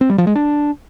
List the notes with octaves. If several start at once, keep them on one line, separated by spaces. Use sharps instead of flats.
C4
G3
F3
G#3
D4